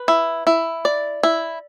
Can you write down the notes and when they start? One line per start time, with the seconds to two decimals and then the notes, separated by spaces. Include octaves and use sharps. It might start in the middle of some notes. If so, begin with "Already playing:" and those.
Already playing: B4
0.08 E4
0.47 E4
0.85 D5
1.23 E4